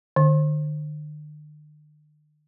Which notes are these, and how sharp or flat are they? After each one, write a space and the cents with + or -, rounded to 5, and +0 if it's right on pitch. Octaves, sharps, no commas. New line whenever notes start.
D3 +45